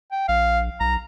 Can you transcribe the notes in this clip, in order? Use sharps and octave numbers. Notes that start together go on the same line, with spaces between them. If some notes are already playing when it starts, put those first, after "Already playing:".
G5
A#1 F5
B1 A#5